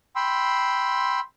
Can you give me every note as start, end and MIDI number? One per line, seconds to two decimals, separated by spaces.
0.16 1.20 79
0.16 1.20 83
0.16 1.20 84
0.16 1.20 88